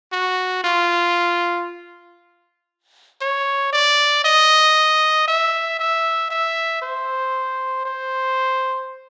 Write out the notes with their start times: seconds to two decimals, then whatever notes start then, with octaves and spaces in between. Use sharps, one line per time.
0.12 F#4
0.64 F4
3.21 C#5
3.73 D5
4.25 D#5
5.28 E5
5.79 E5
6.30 E5
6.82 C5
7.85 C5